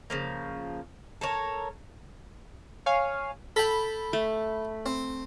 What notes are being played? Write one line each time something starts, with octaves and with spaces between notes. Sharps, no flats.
C#3 F3 A#3
A4 A#4 C#5
C#5 F5 G#5
A4 G5 B5
A3
C4